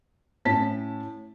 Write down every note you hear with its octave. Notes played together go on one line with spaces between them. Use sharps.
A2 C#4 A5 B6